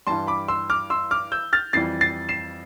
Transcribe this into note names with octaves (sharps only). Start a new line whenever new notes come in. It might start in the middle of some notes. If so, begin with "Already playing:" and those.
G2 E3 G3 A5 C6
B5 D6
C6 E6
D6 F6
C6 E6
D6 F6
E6 G6
F6 A6
F2 E3 G3 A6 C7
A6 C7
C7 E7